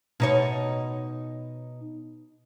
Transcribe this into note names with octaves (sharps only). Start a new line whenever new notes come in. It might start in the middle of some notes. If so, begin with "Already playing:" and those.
B2 D#4 C#5